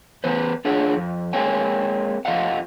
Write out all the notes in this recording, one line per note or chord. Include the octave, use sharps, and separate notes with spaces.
E3 B3 B4 C5
D4 F4 G#4 C#5 F#5
F2
G#3 A#3 C4 C#5 G5 G#5
F2 F3 G#3 D#5 F5 F#5